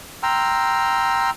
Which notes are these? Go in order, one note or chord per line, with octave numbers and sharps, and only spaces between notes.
G5 A#5 C6 E6 F6